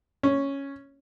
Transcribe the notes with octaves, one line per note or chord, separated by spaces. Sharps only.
C#4